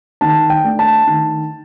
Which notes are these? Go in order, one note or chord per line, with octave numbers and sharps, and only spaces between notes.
D#3 A5
G5
A3 D4
A5
D#3